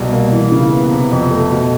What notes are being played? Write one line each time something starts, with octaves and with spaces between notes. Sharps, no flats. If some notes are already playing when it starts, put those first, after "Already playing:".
Already playing: C2 B2
A#3
E3
C#3
B3
C3
F2
A3
B2